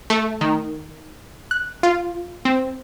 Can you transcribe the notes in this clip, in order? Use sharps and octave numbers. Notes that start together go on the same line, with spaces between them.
A3
D#3
F#6
F4
C4